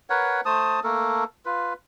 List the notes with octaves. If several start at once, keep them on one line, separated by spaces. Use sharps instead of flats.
A#4 B4 C#5 F#5
A3 C5 A5 D#6
A3 A#3 A4 A#4
F4 B4